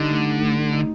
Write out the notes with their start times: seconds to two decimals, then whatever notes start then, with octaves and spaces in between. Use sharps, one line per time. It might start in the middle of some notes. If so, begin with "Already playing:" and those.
Already playing: D3 G3 D#4
0.09 A2
0.24 A2
0.40 A2
0.56 A2
0.71 D#4